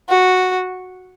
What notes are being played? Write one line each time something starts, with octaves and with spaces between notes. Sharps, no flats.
F#4